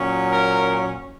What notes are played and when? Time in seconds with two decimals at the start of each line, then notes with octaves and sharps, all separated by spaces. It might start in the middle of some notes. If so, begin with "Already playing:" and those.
Already playing: A#2 F#3 C#4
0.29 A#4